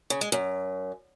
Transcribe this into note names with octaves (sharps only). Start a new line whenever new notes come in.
C#3
G#3
F#2